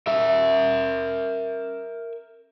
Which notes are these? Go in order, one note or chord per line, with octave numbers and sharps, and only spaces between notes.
A#4 E5